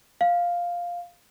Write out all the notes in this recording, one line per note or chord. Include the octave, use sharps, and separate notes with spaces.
F5